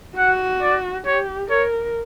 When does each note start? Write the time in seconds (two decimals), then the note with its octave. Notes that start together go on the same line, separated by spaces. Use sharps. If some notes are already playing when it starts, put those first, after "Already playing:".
0.18 F#4 F#5
0.62 D5
1.06 G4 C#5
1.50 A#4 C#5